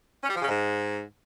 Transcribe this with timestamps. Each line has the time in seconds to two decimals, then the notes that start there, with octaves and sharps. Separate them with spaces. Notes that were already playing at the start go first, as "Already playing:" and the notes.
0.23 C#4
0.29 G3
0.36 F3
0.42 C#3
0.48 G#2